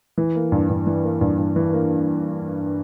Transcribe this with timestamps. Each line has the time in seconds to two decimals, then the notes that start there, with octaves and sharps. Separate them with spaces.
0.18 E3
0.35 A#3
0.52 G2
0.69 G2
0.86 E3
1.04 A#3
1.21 G2
1.38 G2
1.56 E3
1.73 A#3